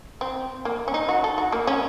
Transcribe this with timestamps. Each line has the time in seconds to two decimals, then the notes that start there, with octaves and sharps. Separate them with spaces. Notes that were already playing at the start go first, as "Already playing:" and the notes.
0.21 C4
0.65 A#3
0.88 C#4
0.94 D#4
1.09 F#4
1.24 A4
1.38 F#4
1.52 A#3
1.67 C#4